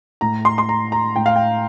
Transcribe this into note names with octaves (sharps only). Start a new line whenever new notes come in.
A2 A#5
C6
C6
A#5
A#5
A2 G5
F5
G5